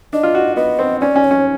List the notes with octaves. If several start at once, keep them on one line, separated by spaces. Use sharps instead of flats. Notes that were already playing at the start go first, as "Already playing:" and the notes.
D4 D#5
F4
F#4
B3 D#5
C4
C#4 D5
C#4
C#5
C#4